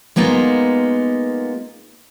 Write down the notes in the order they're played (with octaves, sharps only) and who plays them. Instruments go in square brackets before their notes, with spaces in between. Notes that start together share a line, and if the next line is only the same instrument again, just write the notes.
[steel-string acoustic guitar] G#3 A#3 B3 D#4 F4